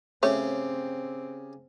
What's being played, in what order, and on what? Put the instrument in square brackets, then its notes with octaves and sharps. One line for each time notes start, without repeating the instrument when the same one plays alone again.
[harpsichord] C#3 G4 [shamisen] A3 C#5 [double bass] C4